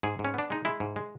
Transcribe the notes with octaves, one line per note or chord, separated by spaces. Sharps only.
G#2 G#4
G#2
C#4
B3 D4
G#3 D#4
G#3 E4
G#2
G#3